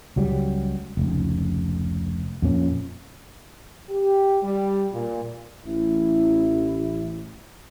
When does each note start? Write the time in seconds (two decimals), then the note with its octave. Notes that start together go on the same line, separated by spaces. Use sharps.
0.16 C#2 F#3 G3
0.97 F1 C#2
2.42 F2 A#2 C#4
3.89 G4
4.43 G3
4.93 A#2
5.65 A1 E4